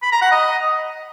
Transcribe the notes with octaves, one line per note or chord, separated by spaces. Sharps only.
B5
A#5
F#5
D#5